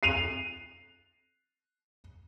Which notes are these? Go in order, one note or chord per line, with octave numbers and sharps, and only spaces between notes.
C7 D#7 F7